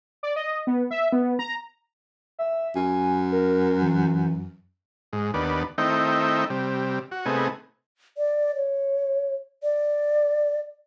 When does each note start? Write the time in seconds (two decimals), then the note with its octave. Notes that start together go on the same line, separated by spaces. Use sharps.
0.23 D5
0.36 D#5
0.67 B3
0.91 E5
1.13 B3
1.39 A#5
2.39 E5
2.76 F#2 G#5
3.32 A#4
3.82 E3
5.13 G#2
5.34 D#2 B3 D4
5.78 D#3 A3 C4 D#4 E4 G5
6.50 C3 G3
7.11 F#4
7.26 C3 A3 B3 D#4 G#4
8.17 D5
8.55 C#5
9.63 D5